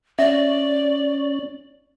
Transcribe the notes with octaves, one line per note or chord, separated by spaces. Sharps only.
C#4 D5 E5